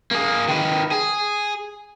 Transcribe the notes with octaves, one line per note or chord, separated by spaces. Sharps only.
A#3 G#4
D#3 B4
G#4